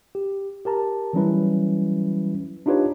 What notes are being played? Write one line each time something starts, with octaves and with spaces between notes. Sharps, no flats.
G4
G4 A#4 A5 A#5
E3 F#3 G3 C#4 E4 B4
D4 D#4 F4 G4 B4 C#5